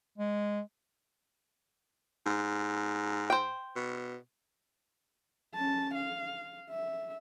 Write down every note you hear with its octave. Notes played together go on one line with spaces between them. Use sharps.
G#3
G#2
C5 G5
B2
C#4 A5
F5
E5